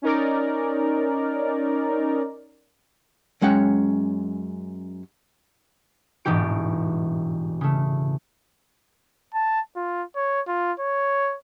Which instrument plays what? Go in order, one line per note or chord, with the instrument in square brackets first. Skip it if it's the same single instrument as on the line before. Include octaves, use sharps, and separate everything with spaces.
[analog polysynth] C#4 D#4 A#4 D5
[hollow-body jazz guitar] F#2 G#3 C#4 F#5 G5
[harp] E1 A1 G#2 G3 G4 D7
C#3 A3
[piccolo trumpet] A5
F4
C#5
F4
C#5